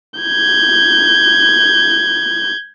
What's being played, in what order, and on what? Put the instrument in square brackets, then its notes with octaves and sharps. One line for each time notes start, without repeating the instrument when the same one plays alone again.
[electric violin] G6 G#6